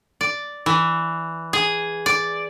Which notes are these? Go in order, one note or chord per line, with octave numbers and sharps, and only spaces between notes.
D5
E3
G#4
D5